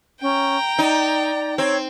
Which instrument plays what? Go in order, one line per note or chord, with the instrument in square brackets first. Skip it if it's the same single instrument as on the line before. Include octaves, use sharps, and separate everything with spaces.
[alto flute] C#4 [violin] G5 A#5
[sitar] D#4 [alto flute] D5
[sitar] C4 [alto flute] C#5